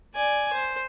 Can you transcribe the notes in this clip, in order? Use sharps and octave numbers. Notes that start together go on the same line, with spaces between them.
D5 G#5
C5